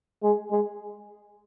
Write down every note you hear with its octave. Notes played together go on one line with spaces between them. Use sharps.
G#3
G#3